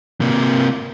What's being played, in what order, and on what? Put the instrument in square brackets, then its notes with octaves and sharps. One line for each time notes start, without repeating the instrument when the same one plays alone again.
[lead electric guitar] C3 A#3